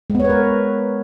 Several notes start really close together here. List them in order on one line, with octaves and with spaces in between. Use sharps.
G#3 B3 C#5 B4 A#4